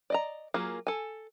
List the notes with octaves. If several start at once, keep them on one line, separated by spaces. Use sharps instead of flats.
D5 D#5 A#5
F#3 A#3 F4 G#4
A4 G#5